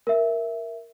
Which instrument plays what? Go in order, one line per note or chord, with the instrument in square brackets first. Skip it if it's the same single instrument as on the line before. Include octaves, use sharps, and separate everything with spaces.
[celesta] A#4 E5